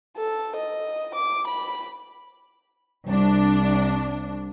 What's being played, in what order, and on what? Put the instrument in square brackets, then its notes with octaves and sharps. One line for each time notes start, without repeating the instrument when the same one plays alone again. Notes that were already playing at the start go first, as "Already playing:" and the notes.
[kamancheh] A4
D#5
D6
B5
[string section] C2 D4